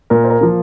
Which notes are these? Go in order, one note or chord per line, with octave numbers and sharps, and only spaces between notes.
A#2 A#4
C5
A#4
F3 A#3